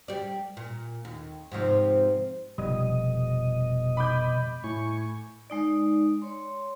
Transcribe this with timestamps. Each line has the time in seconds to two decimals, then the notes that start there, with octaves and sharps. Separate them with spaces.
0.08 G3 D5
0.57 A#2
1.05 D#2
1.52 G#2 C3 F3
2.58 F1 B2 G3 D#5 D#6
3.97 B5 D6 G6
4.64 A2 G#5 C#6
5.50 G#3 D#4 D5
6.22 C#5 C6